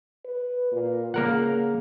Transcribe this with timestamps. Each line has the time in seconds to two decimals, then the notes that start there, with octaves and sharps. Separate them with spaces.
0.25 B4
0.72 A#2
1.14 C#3 A#3 A#4 F#5